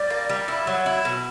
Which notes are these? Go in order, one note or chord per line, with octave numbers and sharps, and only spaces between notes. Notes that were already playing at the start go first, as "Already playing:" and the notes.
Already playing: G3 D5
A#3
G3
E4
F#3
E4
B2